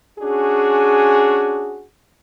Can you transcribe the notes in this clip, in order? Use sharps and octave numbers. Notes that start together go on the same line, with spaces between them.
C#4 D4 F#4 G#4